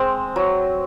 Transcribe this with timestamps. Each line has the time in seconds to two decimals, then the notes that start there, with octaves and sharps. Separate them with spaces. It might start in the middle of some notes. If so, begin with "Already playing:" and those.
Already playing: G#3 C4
0.36 F#3